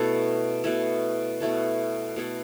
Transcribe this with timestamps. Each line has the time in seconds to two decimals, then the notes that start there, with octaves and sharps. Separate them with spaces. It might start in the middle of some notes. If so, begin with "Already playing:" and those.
Already playing: B2 A3 E4 A4
0.64 B2 A3 E4 A4
1.40 B2 A3 E4 A4
2.16 B2 A3 E4 A4